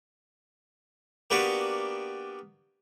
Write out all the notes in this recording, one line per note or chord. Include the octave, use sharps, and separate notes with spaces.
A#3 B3 D4 F#4 G4 B4